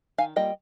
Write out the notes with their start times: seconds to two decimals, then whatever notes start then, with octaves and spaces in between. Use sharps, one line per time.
0.18 D#3 F5 G#5
0.36 G3 A#3 F4 D#5 G5